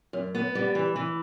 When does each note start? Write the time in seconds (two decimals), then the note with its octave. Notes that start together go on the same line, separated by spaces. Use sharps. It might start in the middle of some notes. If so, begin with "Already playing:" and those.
0.13 F#2
0.35 B3
0.55 G3
0.75 E3
0.96 E3